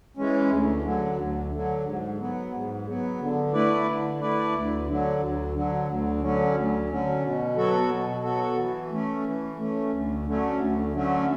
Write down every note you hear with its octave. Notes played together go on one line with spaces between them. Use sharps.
E3 G#3 C#4
D2
D3 F#3
D2
D3 F#3
G#2
F#3 B3
G#2
F#3 B3
D3
A3 E4 B4 D5
D3
A3 E4 B4 D5
D2
D3 F#3
D2
D3 F#3
D2
D3 F#3 C#4
D2
D3 F#3 C#4
B2
F#3 B3 F#4 A4
B2
F#3 B3 F#4 A4
E3
A3 C#4
E3
A3 C#4
D2
D3 F#3 A3 C#4
D2
D3 F#3 A3 C#4